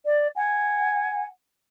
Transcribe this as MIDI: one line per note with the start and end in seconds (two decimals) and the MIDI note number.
0.04 0.27 74
0.35 1.25 78
0.35 1.25 80